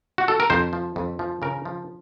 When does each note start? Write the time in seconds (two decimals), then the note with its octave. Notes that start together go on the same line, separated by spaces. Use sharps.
0.18 F#4
0.28 A4
0.40 A#4
0.50 F2 C5
0.73 F3
0.96 F2
1.19 F3
1.42 C#3 A#4
1.65 F3